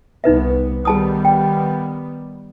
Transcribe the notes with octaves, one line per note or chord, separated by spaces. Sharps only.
C2 B3 D#4 B4 E5
D#3 G3 B3 G#4 A5 D#6
G5